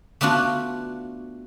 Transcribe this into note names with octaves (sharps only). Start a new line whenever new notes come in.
A3 B3 D4 F4 F#4